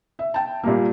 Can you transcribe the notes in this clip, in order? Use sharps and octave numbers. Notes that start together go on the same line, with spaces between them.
E5
G5 A5
A#2 G3 A#3